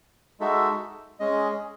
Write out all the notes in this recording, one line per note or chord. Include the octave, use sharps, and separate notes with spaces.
G#3 D#4 F#4 A4 E5
G#3 C#4 G#4 D#5